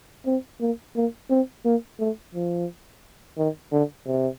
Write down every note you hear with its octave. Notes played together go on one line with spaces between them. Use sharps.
C4
A#3
A#3
C4
A#3
A3
F3
D#3
D3
C3